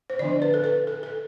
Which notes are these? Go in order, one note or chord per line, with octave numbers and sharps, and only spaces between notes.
C5
D3 F3 B3 D4 D5
B4
A4
B4
A4
A4